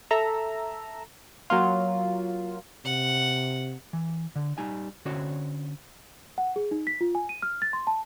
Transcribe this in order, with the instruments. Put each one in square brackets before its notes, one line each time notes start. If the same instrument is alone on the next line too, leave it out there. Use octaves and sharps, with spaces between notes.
[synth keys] A4 E5 A#5 E6
F#3 A#3 F4
[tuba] C3 [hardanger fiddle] F#5
[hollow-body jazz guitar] E3
D3
G3 D#4 G#5
D3 C#4 F#4 C5 C#5
[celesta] F#5
G#4
D#4
B6
F4
G#5
D#7
F6
A6
C6
A5